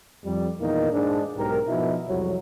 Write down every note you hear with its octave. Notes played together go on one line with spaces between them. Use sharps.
F2 G3
E2 A#2 D#3 A#3 D#4
G#2 G#3 D4
B1 G#2 G4 A#4
B2 F3 D#4 E4
C2 F2 F#3